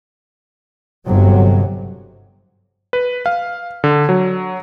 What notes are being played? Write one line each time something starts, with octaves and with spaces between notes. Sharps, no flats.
G1 C3 F#3
B4
F5
D3
F#3